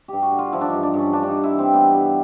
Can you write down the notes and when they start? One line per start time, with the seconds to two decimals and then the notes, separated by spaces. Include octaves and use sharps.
0.08 G2 G4
0.22 F#4
0.32 D3
0.39 F4
0.52 F3 E4
0.61 D4
0.68 G2 D#4
0.83 D4
0.94 G2 C#4
1.13 G2 D4
1.23 D4
1.28 D#4
1.34 G2
1.44 E4
1.53 E3
1.59 C4
1.73 G3 B3
1.94 G2